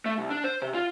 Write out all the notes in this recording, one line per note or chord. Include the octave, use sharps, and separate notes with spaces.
A3
C2
D4
C5
C3
F4